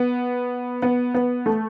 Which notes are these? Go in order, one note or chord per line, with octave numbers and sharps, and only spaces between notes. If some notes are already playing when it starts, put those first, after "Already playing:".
Already playing: B3
B3
B3
A3